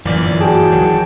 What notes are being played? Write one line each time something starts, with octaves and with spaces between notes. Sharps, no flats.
G1 F#2 A#2 E3 D5
F#4 G#4 G5 A5
C#2 D#3 F#3